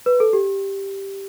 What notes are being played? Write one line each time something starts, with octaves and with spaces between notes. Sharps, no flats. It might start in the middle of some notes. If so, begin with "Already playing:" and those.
B4
A4
G4